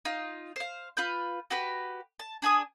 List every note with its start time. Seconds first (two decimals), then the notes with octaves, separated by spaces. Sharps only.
0.05 D#4 F4
0.56 C5 F5
0.97 F4 B4 G6
1.50 F#4 G4 B4
2.19 A5
2.42 D4 G#4 G#5 D#6